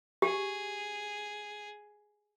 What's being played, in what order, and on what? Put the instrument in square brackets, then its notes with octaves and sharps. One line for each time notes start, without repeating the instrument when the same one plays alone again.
[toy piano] G4 [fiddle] G#4